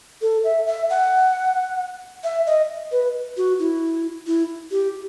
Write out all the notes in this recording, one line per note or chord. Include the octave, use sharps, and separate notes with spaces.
A4
E5
E5
F#5
E5
D#5
B4
F#4
E4
E4
G4